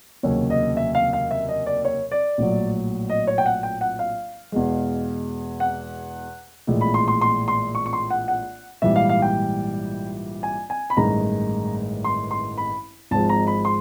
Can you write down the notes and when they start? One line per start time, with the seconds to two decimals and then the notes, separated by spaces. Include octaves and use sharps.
0.23 F1 D#2 C#3 F#3 C#5
0.50 D#5
0.77 E5
0.95 F5
1.13 F5
1.31 E5
1.49 D#5
1.66 D5
1.85 C#5
2.12 D5
2.38 A#1 A2 F#3
3.10 D#5
3.27 C#5
3.38 G5
3.46 F#5
3.63 G5
3.81 F#5
3.99 F5
4.52 E2 B2 G#3
5.60 F#5
6.67 A#1 A2 E3 G#3
6.81 B5
6.94 C6
7.08 C6
7.21 C6
7.48 C6
7.75 C#6
7.86 C#6
7.93 C6
8.10 F#5
8.28 F#5
8.82 A#1 G#2 E3 G3 E5
8.96 F5
9.09 F5
9.22 G5
10.43 G#5
10.70 G#5
10.90 B5
10.97 A1 G2 D#3 G#3 A#5
12.04 C6
12.31 C6
12.58 B5
13.11 G#1 G#2 F3 G#3 A5
13.29 A#5
13.47 B5
13.65 C6